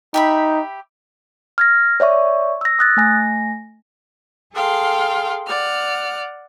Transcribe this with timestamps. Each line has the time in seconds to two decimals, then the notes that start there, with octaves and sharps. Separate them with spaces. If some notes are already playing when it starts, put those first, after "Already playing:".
0.14 D#4 G4 E5 B5
1.58 F6 G#6 A#6
2.00 C#5 D5 E5 C#6
2.61 E6 A#6
2.79 D#6 F#6 A6
2.97 A3 G#5 A#6
4.53 G#4 A4 F5 G5 C6
5.46 D5 F#5 F6